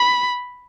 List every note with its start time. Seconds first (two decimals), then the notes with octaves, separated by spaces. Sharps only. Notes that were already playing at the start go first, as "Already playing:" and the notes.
Already playing: B5